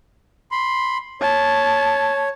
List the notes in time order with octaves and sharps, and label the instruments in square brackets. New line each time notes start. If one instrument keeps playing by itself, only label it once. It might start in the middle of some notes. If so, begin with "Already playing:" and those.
[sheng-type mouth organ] B5 C6
[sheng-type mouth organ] C#5 [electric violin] A5